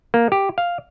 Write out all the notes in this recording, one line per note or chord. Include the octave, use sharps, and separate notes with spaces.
A#3
G4
F5